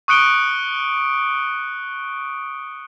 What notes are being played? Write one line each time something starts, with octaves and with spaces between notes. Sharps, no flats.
C#6 D#6 F#6 C#7 D7 G7